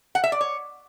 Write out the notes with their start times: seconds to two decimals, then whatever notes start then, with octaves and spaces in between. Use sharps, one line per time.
0.15 F#5
0.24 E5
0.32 D5
0.41 C#5